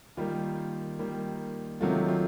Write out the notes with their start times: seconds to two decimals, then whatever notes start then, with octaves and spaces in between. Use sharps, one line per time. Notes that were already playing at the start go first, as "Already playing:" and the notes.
0.17 D#3 G3 A#3 F4
0.99 D#3 G3 A#3
1.81 C3 D#3 F#3 A3 F4
2.08 F4